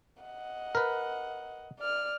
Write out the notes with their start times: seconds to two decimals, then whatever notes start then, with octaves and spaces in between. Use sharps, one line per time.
0.23 D#5 F#5
0.75 A#4 B4
1.79 D5 F6